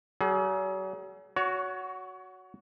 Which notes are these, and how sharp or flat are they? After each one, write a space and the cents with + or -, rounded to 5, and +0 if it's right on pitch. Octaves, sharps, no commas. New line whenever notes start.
F#3 +45 G#4 +30
F#4 +0 C#5 +30